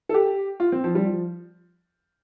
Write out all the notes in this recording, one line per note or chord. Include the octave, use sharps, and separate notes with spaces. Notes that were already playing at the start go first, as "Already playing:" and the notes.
A4
G4
F4
C4
F3
G3
F3